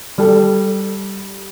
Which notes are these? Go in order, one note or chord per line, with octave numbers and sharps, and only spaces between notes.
G3 A4